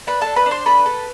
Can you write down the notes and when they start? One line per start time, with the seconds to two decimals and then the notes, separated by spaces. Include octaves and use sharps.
0.07 D4 B4 B5
0.21 D4 A4 A5
0.36 B4 B5
0.46 D4
0.51 C5 C6
0.66 A4 B4 B5
0.86 A4